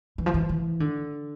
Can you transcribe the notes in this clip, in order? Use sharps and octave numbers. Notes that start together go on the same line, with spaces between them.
E3
F3
E3
E3
D3